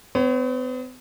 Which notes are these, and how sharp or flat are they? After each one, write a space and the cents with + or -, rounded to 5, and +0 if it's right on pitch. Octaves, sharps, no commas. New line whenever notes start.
B3 +45 C#5 +0